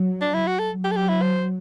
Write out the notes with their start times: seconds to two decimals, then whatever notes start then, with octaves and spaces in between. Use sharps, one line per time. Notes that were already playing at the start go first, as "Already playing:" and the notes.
Already playing: F#3
0.21 D4
0.34 E4
0.47 F#4
0.59 A4
0.71 F#3
0.84 G4
0.91 A4
0.96 G4
1.09 E4
1.21 C5